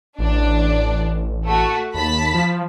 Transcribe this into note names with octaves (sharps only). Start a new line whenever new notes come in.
A1 D4 D5
A3 F#4
D#2 A5 B5 B6
F3